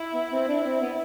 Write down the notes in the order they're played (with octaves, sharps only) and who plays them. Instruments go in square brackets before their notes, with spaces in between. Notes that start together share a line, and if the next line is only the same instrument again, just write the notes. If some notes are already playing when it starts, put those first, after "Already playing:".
Already playing: [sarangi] E4
[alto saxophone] B3
C4
D4
C4
B3